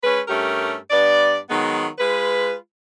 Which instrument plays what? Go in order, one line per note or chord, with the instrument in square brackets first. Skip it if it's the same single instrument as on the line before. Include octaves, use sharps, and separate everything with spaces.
[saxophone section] G#3 C#4 B4
G2 A3 C#4 G4 A#4
G2 B3 D5
D#3 F#3 G#3 B3
G#3 F4 B4